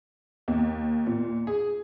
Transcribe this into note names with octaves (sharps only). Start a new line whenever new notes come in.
D#2
A#2
G#4